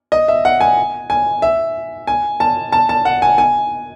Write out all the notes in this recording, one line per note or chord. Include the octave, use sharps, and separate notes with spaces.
D#5
E5
F#5
G#5
G#5
E5
G#5
A5
A5
A5
F#5
G#5
G#5